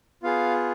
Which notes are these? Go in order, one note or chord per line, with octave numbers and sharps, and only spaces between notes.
B3 F4 G#4 F5